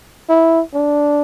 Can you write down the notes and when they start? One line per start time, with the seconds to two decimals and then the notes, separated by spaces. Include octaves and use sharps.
0.29 E4
0.74 D4